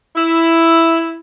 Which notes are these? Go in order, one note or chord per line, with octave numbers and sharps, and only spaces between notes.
E4